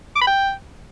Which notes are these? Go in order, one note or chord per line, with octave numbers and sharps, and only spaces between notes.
D6
B5
G5